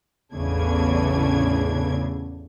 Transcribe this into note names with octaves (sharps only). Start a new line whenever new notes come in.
A1 E2 C#3 A3 D4 G#6